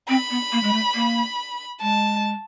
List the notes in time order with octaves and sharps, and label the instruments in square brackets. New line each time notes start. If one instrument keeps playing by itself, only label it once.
[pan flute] C4 [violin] B5
[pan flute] B3
A#3
G#3
A3
A#3
[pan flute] G#3 [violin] A5